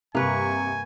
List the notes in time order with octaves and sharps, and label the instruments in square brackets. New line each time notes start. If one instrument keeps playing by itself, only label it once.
[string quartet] G2 C#6 [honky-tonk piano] C3 [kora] A#3 B4 [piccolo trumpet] G#5